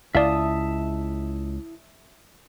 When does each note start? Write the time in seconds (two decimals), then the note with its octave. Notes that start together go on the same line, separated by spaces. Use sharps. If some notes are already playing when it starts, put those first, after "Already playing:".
0.15 C#2 E4 D5 E5 F5 A5 D#6